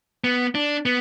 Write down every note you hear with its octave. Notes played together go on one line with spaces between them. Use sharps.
B3
D4
B3